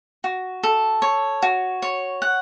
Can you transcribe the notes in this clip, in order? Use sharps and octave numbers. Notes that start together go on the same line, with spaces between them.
F#4
A4
C#5
F#4
C#5
F#5